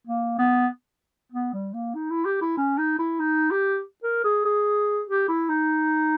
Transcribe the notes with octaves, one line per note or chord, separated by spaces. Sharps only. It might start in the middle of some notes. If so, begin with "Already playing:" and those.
A#3
B3
B3
G3
A#3
D#4
E4
G4
E4
C#4
D#4
E4
D#4
G4
A#4
G#4
G#4
G4
E4
D#4